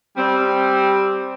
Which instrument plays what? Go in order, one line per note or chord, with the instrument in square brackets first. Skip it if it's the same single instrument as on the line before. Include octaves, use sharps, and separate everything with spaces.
[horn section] G3 C4